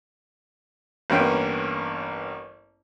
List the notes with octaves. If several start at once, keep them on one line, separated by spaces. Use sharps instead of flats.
A1 G2 A#3 B3 C#4 G5